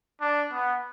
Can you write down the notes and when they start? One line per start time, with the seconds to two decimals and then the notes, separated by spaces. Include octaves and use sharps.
0.21 D4
0.52 B3